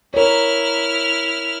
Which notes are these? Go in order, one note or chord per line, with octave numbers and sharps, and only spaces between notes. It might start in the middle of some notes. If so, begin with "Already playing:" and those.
E4 A#4 C#5 F6